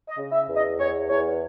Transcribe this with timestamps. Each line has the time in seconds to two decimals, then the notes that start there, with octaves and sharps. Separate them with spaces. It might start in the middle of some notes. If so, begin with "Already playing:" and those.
0.09 D#5
0.17 C#3
0.32 E5
0.48 E2
0.55 D#5
0.79 E2 C#5
1.09 E2 C#5